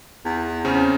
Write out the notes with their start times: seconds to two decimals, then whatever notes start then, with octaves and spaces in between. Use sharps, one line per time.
0.25 E2
0.65 C#3 C4 C#4